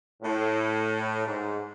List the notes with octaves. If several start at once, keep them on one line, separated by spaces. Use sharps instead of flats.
A2
G#2